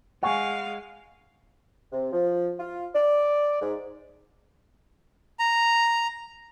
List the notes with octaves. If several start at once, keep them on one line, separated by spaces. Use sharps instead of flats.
G#3 F5 F#5 G#5 C#6
C3
F3
F4
D5
G#2
A#5